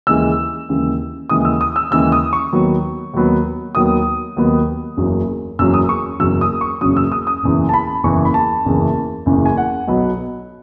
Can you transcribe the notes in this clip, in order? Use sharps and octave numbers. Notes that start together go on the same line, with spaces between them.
D#2 C#3 E3 G#3 E6
D#2 C#3 E3 G#3
D#2 C#3 E3 G#3 D#6
E6
D#6
E6
D#2 C#3 E3 G#3 E6
D#6
C#6
D#2 D#3 F#3 B3
D#2 D#3 F#3 B3
D#2 D#3 F#3 B3 D#6
D#2 D#3 F#3 B3
F#1 E2 C#3 F#3
F#1 E2 C#3 F#3 E6
D#6
C#6
F#1 E2 C#3 F#3 E6
D#6
C#6
F#1 E2 C#3 F#3 D#6
E6
D#6
D#6
F#1 E2 C#3 E3
A5
B5
F#1 E2 C#3 E3 C#6
B5
A5
F#1 E2 C#3 E3
F#1 E2 C#3 E3
G#5
F#5
B1 B2 F#3 B3